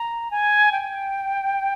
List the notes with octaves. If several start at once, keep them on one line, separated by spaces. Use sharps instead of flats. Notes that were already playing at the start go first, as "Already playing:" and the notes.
Already playing: A#5
G#5
G5